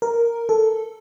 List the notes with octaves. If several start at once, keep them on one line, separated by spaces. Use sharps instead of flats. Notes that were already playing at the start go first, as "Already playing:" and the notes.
A#4
A4